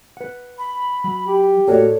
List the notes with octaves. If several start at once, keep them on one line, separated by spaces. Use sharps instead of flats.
B4 F#5
B5
F#3
G4
A2 A#3 F#4 A4 C#5 D5